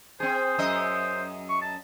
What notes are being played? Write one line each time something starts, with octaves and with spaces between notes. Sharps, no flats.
C4 G#4 C5
F#2 D#5 E5
C5
C#6
A5